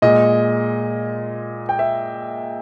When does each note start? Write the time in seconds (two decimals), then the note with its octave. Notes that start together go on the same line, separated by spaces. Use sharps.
0.02 A#2 G#3 D#5
1.69 G5
1.79 E5